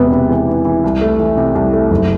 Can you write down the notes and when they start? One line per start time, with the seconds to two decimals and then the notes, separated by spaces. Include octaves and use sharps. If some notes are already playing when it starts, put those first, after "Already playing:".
Already playing: E1 C3 B3
0.12 C3
0.29 E2
0.47 E3
0.65 E3
0.84 C2
1.01 A3
1.20 E3
1.37 C3
1.55 C2
1.73 A3
1.91 F#1